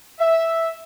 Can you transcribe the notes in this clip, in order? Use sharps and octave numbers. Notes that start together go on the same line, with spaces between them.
E5